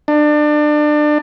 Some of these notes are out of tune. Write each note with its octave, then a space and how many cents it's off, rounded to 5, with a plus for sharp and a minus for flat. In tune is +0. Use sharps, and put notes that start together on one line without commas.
D4 +30